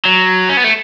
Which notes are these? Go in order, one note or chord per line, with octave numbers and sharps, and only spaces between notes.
F#3
C#4
B3
A3